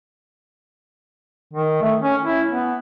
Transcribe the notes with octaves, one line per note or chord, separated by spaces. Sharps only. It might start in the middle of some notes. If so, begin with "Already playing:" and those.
D#3
A3
C#4
E4
B3